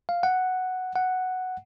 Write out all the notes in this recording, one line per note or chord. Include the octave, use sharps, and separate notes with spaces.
F5
F#5
F#5